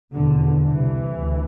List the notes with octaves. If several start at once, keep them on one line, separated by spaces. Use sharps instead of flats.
E2 B2 D3
C2 C3 E3
D2